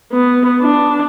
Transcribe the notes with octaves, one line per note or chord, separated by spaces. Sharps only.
B3
D4